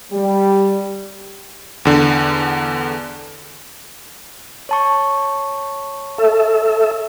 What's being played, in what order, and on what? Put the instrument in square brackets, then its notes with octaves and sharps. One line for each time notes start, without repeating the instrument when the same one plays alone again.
[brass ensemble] G3
[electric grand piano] E2 D3
[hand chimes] C#5 A5 C#6
[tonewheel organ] A4 E5